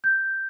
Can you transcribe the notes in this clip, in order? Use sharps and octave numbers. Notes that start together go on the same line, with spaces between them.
G6